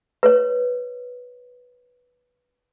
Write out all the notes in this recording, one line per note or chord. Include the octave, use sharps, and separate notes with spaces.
B4 C#5